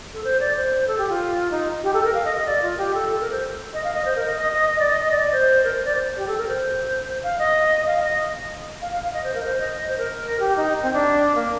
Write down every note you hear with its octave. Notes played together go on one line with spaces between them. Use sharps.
A4
C5
D5
C5
A4
G4
F4
D#4
G4
A4
A#4
F5
D#5
D#5
D5
F4
G4
A4
A4
A#4
C5
D#5
F5
D#5
C5
A#4
D#5
D#5
D#5
D#5
D5
D#5
D#5
D5
D5
C5
A#4
C5
D5
C5
G4
A4
A#4
C5
F5
D#5
F5
D#5
F5
F5
F5
D#5
C5
A#4
C5
D#5
D#5
C5
A#4
G4
D#4
C4
D4
A#3